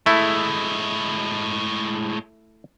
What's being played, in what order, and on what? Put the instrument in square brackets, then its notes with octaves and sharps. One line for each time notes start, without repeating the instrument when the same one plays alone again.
[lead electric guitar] A2 G#3 [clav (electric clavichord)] A3 E4